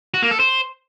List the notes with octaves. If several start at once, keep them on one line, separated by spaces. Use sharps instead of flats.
F#4
A#3
A4
C5